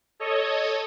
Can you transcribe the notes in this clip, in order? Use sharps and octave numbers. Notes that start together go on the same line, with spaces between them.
A4 C#5 D#5